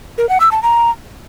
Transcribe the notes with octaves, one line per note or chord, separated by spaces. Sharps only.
A#4
F#5
E6
A5
A#5